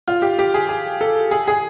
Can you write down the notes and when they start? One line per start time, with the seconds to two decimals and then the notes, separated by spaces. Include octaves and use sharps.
0.08 F4
0.22 G4
0.39 G4
0.54 G#4
0.69 G#4
1.01 A4
1.31 G#4
1.48 G#4